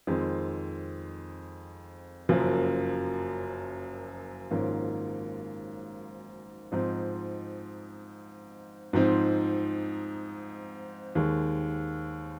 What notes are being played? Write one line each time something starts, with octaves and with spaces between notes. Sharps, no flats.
F2 D#3 G#3 C4
F#1 F#2 F3 A#3
G#1 G#2 F3 A#3 C#4
G#2 F3 C4 D#4
G#2 F3 C4 D#4
D#2 D#3 G#3